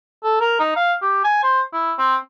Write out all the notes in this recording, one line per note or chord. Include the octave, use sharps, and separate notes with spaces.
A4
A#4
D#4
F5
G4
G#5
C5
E4
C4